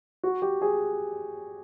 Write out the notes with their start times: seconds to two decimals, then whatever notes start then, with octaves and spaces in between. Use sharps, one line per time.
0.24 F#4
0.42 G4
0.62 G#4